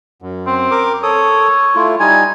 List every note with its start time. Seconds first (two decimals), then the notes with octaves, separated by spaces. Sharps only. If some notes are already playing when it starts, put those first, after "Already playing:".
0.22 F#2
0.47 C4
0.71 A#4 D6
1.03 A4 C#5 D#6
1.76 A3 E4 F4
2.00 G3 D#4 G#5